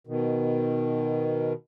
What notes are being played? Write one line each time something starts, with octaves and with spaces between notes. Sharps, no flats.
B2 D#3